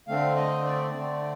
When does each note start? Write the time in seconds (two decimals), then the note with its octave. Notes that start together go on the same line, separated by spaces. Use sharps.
0.08 D3 A3 C4 F5
0.36 D#5
0.65 D5
0.93 D3 A3 C4